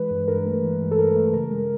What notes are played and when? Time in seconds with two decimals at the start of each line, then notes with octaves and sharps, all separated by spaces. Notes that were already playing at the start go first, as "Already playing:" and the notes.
Already playing: E3 G#3 B4
0.10 G2
0.28 G2 A#4
0.46 A3
0.63 E3
0.81 G2
0.91 A4
0.98 G2 A#4
1.16 A3
1.33 C#3 A#4
1.51 G#3